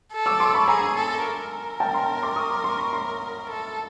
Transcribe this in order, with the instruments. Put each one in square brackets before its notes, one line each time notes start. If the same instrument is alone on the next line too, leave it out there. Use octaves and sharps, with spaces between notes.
[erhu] A4
[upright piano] D6 E6
C6 D6
B5 C#6
[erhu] G#4 [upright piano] G#5 A#5
[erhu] A4
A#4
[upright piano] G5 A5
A#5 C6
C6 D6
C#6 D#6
C6 D6
C6 D6
B5 C#6
A#5 C6
[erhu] A4